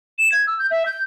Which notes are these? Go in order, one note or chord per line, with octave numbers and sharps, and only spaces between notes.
E7
G#6
E6
G6
E5
G6